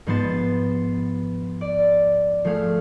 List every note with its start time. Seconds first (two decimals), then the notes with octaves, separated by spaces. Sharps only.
0.07 G#2 F3 B3 C6 A6 E7
1.61 D5
2.45 F3 A3 G#4 F5